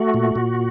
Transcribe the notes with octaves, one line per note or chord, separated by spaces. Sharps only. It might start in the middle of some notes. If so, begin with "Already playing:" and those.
Already playing: A3 F#4
A#2
A#2